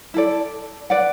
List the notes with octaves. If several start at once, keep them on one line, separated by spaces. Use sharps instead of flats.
E4 A4 D5
B4 D5 F#5